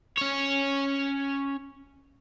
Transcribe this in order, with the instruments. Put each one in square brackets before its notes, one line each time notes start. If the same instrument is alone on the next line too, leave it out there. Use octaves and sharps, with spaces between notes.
[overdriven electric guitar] C#4 C#5